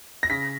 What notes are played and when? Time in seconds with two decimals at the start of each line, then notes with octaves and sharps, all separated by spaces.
0.23 A#6
0.30 C#3 B6